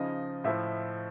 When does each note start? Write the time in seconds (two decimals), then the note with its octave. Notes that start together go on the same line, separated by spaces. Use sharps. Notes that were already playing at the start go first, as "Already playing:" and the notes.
Already playing: C#3 F3 D#4 D#5
0.44 A2 F3 E4 E5